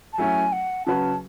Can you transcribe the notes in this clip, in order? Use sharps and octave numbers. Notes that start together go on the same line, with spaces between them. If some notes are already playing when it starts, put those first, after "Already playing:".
A5
F#3 A3 C#4 E4 G#5
F#5
C#3 F#3 C#4 F#4 B4 A5